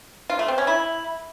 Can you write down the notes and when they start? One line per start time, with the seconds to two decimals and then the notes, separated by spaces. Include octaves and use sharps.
0.30 F4
0.39 A3
0.48 C4
0.58 C#4
0.67 E4